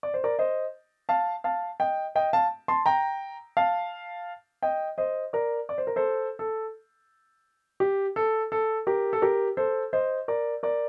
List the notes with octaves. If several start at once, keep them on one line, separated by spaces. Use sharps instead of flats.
D5
C5
A#4 D5
C5 D#5
F5 A5
F5 A5
D#5 G5
D#5 G5
F5 A5
A5 C6
G5 A#5
F5 A5
D#5 G5
C5 D#5
A#4 D5
D5
C5
A#4
A4 C5
A4
G4
A4
A4
G4 A#4
A4
G4 A#4
A4 C5
C5 D#5
A#4 D5
A#4 D5